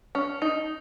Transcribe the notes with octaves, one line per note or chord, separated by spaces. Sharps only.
C#4
D#4